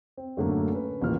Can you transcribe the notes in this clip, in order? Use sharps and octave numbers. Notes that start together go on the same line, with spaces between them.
C4
F#2 A2 D3 F#3 A3 A#3
C#4 B4
D#1 A1 D#2 A#2 E3 F6